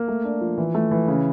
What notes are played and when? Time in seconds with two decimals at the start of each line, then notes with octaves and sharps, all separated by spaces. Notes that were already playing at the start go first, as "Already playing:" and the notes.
Already playing: A#3
0.08 A3
0.24 D4
0.41 F3
0.58 E3
0.75 A3
0.91 E3
1.08 C#3